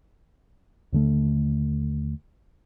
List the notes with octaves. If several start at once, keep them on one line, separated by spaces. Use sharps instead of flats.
D#2 D3 A3